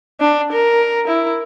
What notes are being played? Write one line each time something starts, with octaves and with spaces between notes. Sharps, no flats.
D4
A#4
E4